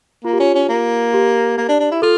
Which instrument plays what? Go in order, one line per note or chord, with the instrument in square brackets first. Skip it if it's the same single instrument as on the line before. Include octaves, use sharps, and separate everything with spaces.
[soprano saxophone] A#3 [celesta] F4
[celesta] G4
[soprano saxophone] C#4 [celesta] F4
[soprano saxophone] C#4
A#3
[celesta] G4
[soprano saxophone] A#3
D4
D4
E4
[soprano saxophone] F4 [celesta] A4